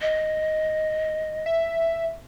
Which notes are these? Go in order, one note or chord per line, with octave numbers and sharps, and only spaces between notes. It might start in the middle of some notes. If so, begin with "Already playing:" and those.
D#5
E5